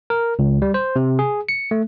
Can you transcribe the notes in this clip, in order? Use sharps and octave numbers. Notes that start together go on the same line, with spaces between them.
A#4
C#2
G3
C5
C3
G#4
C#7
A3